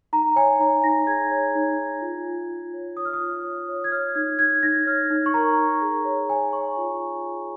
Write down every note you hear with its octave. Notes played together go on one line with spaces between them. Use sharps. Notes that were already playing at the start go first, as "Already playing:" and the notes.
D#4 A#5
C#5 G#5
D#4 A#5
D#4 A#6
G#4 G#6
C#5
D#4
D#4
F4
F4
F4
C#5
C#5 D#6
F6
D#6
F4
C#5
C#5
G#6
C#5 F6
D#4 G#6
D#4 G#6
D#4 A#6
C#5 F6
D#4
C#6
A#4 A#5
D#4
G#4
C#5
C#5 G#5
C#5 C#6
F4
F4
G#4